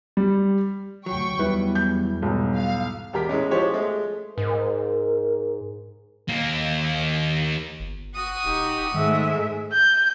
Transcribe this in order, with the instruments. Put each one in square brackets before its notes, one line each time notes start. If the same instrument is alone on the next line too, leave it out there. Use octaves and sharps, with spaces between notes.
[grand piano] G3
[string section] D2 G5 C#6 [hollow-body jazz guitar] F#3
[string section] E2 [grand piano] G3 E4 [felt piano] B4
[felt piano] G6
[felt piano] B1 [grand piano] G#2 G3 D#4
[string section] F5
[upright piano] E1 G4 A#4 B6
A2 G#3 C#4
F3 G#3 G4 C5 C#5
G#3 A3
[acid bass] G#2 [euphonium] A#4
[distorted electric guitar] D#2 A#3
[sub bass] G1
[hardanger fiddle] F#4 D#6
[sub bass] D#1 [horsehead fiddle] D#4 G4
[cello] G#2 A3 [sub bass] D#3 [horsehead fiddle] G#3 E5
[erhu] G6